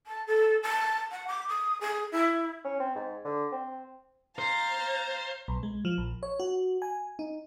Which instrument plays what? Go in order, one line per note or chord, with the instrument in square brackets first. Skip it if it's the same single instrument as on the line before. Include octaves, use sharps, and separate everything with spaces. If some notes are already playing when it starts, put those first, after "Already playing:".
[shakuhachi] A5
A4
A5
F#5
D6
D#6
G#4
E4
[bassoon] C#4
C4
G#2
D3
C4
[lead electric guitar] C5 [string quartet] F5 A#5 A6
[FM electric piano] B1
G#3
F3
A#1
C#5
F#4
G#5
D#4